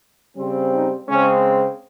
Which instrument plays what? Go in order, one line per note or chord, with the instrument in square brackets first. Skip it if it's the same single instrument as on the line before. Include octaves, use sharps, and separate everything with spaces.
[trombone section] C#3 G3 C4
D#4
C#3 G#3 C4 C#4